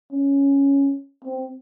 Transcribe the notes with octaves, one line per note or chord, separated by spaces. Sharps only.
C#4
C4